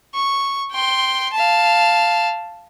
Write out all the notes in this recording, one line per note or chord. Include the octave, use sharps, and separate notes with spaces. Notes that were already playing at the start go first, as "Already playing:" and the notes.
C#6
G5 C6
F5 A5